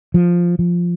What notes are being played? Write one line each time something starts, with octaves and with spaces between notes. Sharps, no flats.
F3
F3